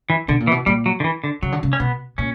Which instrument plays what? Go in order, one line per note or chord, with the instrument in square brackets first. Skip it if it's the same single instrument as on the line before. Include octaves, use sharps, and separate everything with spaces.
[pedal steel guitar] E3
[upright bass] B2 [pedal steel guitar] D3
[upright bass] A#2
[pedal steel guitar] E3
[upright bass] B2
[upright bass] A#2 [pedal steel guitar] G3
[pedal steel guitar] F#3
D3
E3
D3
[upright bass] C#3 [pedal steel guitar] F#3
[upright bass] D3
C#3
[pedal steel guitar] C#4
[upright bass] B2 [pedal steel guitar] B3
[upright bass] A#2 [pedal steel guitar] C#4